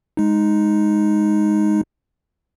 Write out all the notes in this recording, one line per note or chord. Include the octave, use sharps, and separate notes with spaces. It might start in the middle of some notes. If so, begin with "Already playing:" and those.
G#3 D#4